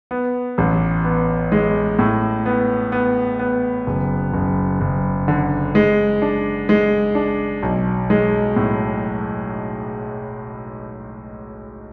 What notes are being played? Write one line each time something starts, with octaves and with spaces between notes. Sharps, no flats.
B3
A1
B3
G#3
A2
B3
B3
B3
F#1
F#1
F#1
D3
G#3
D4
G#3
D4
B1
G#3
A2